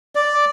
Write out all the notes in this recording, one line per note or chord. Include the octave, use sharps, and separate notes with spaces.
D5